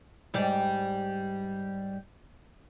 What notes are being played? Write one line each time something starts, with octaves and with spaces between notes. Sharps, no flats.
G#2 G3 D5